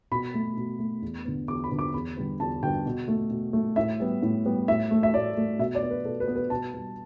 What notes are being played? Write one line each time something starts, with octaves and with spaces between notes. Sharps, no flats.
B2 B5
A3
B2
A3
E2
D3 B3
E2 D6
B5
D3 B3
D6
E2 B5
D3 G3 B3
E2 A5
D3 G3 B3 G5
B2
A3
B2
A3
A2 E5
G3 B3
A2
G3 B3
A2 E5
A3
E5
A2 D5
A3
B2 E5
D5
B3
B4
B2 A4
B4
B3
B4
B2 A5
G3 B3